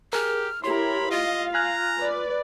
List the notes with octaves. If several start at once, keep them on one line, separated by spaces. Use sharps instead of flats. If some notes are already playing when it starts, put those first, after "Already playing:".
G4 G#4 A#4 F6
E4 G4 A#4 C#5 B5 C6
F4 D#5 F5
G#5 A#5 F6 F#6
B4 D5